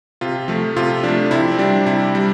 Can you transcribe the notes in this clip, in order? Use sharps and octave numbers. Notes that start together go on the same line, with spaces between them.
C3 F4
F3 A3
C3 F4
F3 D4
A3
C3 E4
C4
G3 D4
C3 E4
G3